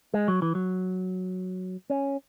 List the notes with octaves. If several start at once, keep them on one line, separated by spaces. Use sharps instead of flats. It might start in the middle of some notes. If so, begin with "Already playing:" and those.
G#3
F#3
E3
F#3
C#4